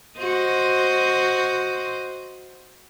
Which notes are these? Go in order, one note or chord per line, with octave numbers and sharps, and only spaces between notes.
F#4 C5 D#5